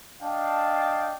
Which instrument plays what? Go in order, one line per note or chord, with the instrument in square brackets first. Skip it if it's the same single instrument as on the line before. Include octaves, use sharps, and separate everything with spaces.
[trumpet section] D4 D#5 F5 G5 A5